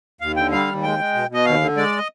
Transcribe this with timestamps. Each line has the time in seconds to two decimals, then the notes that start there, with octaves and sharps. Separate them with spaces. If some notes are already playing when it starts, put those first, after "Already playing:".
0.21 D#2 F5
0.36 D3 G5
0.52 G3 F5
0.67 D#2
0.83 G#3 G5
0.99 G#3
1.14 B2
1.29 B2 D#5
1.45 D#2 F5
1.61 D3
1.77 G#3 D5
1.98 D#5